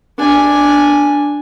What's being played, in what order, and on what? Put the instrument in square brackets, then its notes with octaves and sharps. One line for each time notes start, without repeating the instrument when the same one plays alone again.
[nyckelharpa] D4 G#5